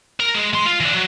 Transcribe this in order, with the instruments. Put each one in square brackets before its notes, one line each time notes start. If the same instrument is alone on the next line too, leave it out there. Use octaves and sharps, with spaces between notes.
[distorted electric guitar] A#4
G#3
G#3 C6
F4
E3 D4
F#3